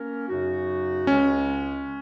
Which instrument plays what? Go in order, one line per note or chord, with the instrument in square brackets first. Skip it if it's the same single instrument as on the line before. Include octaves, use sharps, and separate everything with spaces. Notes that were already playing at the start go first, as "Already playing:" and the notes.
Already playing: [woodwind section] A#3 C#4 A#4
F#2 C#3 F#3 D#4 F#4
[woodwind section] C#2 C#3 G#3 [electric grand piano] C#4